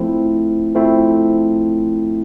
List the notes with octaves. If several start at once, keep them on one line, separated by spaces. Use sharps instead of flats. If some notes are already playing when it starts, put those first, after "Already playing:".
Already playing: F3 A3 C4 E4
F3 A3 C4 E4